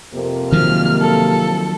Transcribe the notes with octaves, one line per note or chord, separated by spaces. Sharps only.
F2 C3 A#3
D#3 F3 F#3 F6
A4